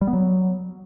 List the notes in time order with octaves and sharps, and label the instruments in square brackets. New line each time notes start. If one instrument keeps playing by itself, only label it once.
[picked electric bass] G3
B3
F#3